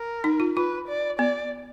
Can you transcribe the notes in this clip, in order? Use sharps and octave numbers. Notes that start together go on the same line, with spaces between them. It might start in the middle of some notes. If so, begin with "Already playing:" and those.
Already playing: A#4
D#4
F4
F4 B4
D5
B3 D5